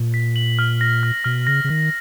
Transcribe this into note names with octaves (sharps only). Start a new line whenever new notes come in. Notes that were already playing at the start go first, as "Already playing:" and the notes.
Already playing: A#2
B6
F#7
F6
A#6
F6
B2 F6
C#3 A#6
C#3
D#3 F6